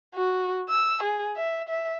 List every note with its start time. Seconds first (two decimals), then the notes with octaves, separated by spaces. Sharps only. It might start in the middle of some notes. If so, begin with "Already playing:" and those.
0.15 F#4
0.69 E6
1.03 G#4
1.37 E5
1.69 E5